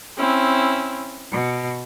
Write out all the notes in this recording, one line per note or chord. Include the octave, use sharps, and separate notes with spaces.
C4 C#4 E4
B2